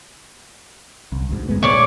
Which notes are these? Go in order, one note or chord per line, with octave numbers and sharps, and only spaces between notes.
C2
D2 G#2
F#2 G#3 B3
A#2 D3 G#3 C#5 D5 D6